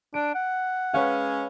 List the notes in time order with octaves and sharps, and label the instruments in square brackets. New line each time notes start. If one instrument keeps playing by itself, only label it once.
[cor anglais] D4 [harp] D7
[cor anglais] F#5
[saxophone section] G#3 C#4 [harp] B4 C#5 F5